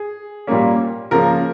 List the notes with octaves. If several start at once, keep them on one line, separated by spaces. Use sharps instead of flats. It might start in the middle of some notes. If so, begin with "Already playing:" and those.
Already playing: G#4
A#2 G3 A#3 C#4
C#3 F3 A#3 A#4